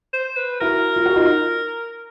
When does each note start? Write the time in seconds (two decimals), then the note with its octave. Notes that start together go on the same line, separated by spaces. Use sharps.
0.13 C5
0.36 B4
0.60 E4 F#4 A#4
0.96 F4
1.06 F#4
1.16 D#4 F4